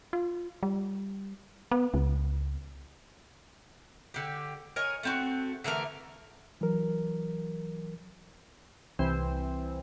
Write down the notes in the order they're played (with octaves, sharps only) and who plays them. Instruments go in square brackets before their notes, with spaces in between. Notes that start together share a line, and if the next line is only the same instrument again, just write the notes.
[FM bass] F4
G3
B3
C#2
[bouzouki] D3 G4
A#4 C#5 D#5 G#5
A3 C4 F#4
D3 E3 A3 A#4
[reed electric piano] E3 F#3 A#4
[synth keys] C2 E3 C4